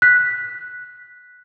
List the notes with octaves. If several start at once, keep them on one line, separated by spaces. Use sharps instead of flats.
F#6 B6